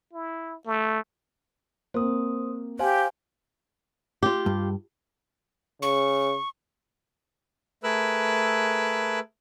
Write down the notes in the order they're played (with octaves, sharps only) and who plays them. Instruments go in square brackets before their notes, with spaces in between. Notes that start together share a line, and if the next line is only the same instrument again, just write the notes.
[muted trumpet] E4
A3
[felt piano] A#3 C4 [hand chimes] C5 D#6
[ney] G4 [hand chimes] C5 F5 G#5
[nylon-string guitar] F4 G4
[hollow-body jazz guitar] G2
[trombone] C#3 [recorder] C#6
[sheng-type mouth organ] A3 G#4 A#4 B4 E6 F#6